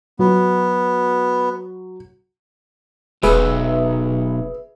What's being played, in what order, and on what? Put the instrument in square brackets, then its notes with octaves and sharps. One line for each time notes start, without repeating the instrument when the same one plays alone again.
[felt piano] F#3 [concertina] B3
[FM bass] E1 [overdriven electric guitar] B1 [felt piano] G#4 [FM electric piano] B4 E5